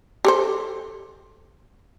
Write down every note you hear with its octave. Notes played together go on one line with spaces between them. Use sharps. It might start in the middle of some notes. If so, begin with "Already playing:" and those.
G4 A4 C5